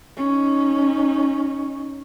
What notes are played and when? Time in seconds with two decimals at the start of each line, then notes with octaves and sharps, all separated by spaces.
0.17 C#4 D#4